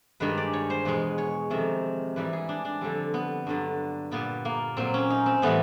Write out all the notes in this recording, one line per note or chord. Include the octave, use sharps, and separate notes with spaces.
G2 D#3 G#3 B4
D5
C#5
C5
E2 B2 G#3 B4
C#5
F2 C3 D#3
G#2 E3 G3 B4
G#4
D4
D4
F2 D3 G3 C4
B3
G2 D3 F#3
A#2 G3 B3
A#3
A#2 F#3 C4
C#4
D#4
C4
A2 E3 G3 B3